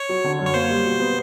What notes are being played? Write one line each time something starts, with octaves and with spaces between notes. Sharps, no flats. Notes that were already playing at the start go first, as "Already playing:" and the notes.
Already playing: C#5
F#3
D3
F#2
C#5
A#3 C5
G3
B2
B3